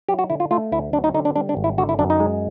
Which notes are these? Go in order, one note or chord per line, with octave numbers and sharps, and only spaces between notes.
F#3 G4
F#4
D3 E4
F4
A3 F4
D2 E4
F#3 D4
D#4
D3 D#4
D4
G3 D4
D4
G#1
E4
D3 F#4
E4
F#2 D4
D#4
G#3